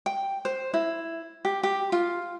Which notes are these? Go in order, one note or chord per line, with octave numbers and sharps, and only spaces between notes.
G5
C5
E4
G4
G4
F4